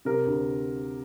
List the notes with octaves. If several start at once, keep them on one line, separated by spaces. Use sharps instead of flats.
C3 A#4
D2